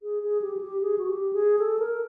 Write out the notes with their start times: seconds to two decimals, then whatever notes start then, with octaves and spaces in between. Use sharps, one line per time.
0.03 G#4
0.23 G#4
0.41 G4
0.57 F#4
0.61 G4
0.82 G#4
0.98 F#4
1.08 G4
1.33 G#4
1.59 A4
1.79 A#4